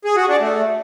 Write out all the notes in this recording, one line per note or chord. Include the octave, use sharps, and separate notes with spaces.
G#4
F#4
D4
A3